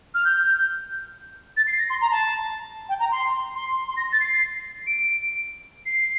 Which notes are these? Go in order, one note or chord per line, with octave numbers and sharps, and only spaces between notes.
F6
G6
A6
C7
A#6
C6
A#5
A5
G5
A#5
C6
C6
C6
A#6
A6
C7
D7
C7